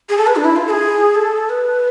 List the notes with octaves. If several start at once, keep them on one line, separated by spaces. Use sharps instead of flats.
G#4
A4
B4
D4
E4
F4
A4
G#4
A4
B4